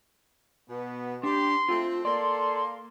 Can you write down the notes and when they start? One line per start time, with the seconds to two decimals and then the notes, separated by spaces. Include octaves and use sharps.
0.69 B2 B3
1.23 D4 G4 C6
1.69 A3 C4 F4
2.05 A#3 A4 D5 C6